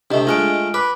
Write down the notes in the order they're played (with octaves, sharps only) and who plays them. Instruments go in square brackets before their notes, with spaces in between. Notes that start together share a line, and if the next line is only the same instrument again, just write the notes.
[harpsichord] C3 A3 [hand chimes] D4 D#5
[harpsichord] G#3 A3 [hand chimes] F4 F6 D7
[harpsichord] B4 [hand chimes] D6